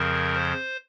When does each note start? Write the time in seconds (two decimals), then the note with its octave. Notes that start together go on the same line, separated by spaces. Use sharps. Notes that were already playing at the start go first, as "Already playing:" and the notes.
Already playing: F2 C#3 F3 A#4
0.35 C5